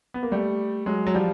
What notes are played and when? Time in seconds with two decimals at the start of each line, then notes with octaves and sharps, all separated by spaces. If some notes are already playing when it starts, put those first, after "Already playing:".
0.14 B3
0.23 A#3
0.31 G3 A3
0.86 F#3 G#3
1.07 F#3
1.14 F3 G3